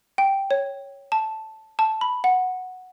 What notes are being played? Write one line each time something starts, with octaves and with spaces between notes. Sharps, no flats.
G5
C#5
A5
A5
B5
F#5